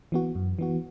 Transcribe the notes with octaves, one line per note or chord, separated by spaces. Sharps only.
E3 B3 F#4
F#2
E3 B3 F#4